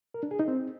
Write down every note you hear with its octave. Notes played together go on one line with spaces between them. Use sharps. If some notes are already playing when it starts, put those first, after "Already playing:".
A#4
D4
G#4
D#4
C4